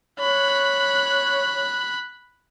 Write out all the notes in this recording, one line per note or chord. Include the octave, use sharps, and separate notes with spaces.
C#5 B5 F#6